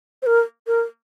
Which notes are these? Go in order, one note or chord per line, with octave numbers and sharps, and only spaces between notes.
C5
A#4
A#4